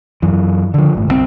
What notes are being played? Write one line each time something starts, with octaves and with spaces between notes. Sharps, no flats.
F#2 E3
D3 F3
G1 A2
C2 D3 C4